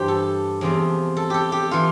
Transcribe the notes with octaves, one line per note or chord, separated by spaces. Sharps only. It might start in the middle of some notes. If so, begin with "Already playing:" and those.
Already playing: G2 E3 G4 C5
A4
E2 C3 F3
A4
G4 A4
G4
E3 F4